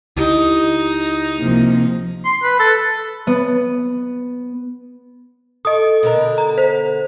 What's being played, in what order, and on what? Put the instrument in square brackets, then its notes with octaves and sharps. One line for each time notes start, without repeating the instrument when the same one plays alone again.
[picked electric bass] C#2 [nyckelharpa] D#4 [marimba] E4 G4 D#5
[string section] C3 F3 A#3
[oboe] C6
B4
A4
[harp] B3
[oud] A4 [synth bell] D#5 D#6
[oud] B2 D3 A#4
[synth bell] A#5
C5